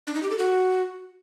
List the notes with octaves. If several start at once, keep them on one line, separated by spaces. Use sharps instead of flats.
D4
D#4
G4
A4
F#4